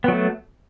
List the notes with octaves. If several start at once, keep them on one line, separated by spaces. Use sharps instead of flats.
F#3 A3 B3